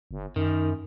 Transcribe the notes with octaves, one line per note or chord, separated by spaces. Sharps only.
G1
F#2 D#3